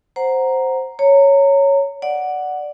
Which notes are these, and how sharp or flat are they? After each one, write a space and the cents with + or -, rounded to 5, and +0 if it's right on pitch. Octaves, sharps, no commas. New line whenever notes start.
C5 +0 F#5 +0 A#5 +0
C#5 +0 A#5 -25
D5 +0 F#5 +0